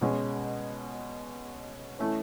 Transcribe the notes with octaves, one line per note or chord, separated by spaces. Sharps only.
B2 G#3 C#4
E3 A3 C#4